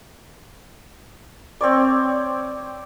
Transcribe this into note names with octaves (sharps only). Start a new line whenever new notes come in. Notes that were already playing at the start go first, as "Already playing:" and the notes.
C4 C#5 D5